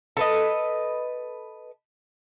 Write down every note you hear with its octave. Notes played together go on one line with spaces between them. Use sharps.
A4 B4 D#5